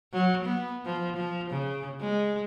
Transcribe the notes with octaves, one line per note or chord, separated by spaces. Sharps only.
F#3
B3
F3
F3
C#3
G#3